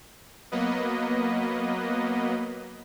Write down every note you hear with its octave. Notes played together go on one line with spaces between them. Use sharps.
F#3 A#3 B3 B4 D#5